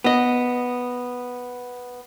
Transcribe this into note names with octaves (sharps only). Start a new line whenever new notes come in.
B3 D#5